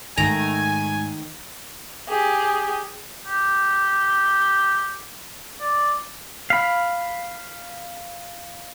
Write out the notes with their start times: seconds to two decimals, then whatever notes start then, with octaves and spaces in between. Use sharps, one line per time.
0.17 G#2 D#3 A3 G#5 A#5
2.09 G4 G#4
3.26 G4
5.61 D5
6.50 F5 B5